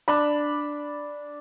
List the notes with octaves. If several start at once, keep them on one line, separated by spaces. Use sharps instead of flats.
D4 B5